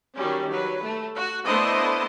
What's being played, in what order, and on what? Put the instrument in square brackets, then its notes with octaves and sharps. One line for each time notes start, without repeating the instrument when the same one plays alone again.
[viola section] D#3 F#3 G3 C#4
F#3 B4
A3
F#4
A3 B3 D4 E4 C5 D#5